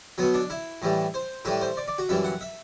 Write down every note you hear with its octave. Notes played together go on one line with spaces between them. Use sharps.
B2 F#3 B3
D4
E4
A2 E3 G3
C5
A2 E3 G3 B4
C5
D5
D5
F#4
F#2 E3 G3 E5
F#5
E5